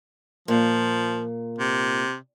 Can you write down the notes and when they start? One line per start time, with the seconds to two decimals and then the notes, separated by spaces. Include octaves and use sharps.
0.48 A#2 F3
1.59 C3